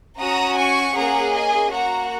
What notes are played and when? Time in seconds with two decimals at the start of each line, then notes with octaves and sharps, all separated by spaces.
0.19 C#4 F#4 A#5 D#6
0.58 G#5 C#6
0.96 A#3 C#4 G#4 F#5 A#5
1.34 D#5 G#5
1.72 A#3 F#4 F#5 A#5